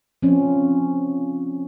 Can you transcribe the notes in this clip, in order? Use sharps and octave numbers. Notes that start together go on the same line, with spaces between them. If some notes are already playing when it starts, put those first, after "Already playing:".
F3 C4 C#4